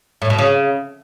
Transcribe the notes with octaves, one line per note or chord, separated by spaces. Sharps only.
A2
B2
C#3